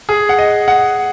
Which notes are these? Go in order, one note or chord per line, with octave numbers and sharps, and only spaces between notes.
G#4
F#5
D#5
F#5